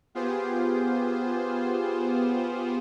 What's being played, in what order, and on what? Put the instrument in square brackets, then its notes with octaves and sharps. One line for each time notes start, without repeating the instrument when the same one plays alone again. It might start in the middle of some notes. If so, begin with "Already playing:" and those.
[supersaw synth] B3 F4 G4 G#4 C5